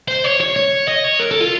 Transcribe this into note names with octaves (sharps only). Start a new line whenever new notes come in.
C5
C#5
C#5
C#5
D#5
C#5
A#4
A4
F4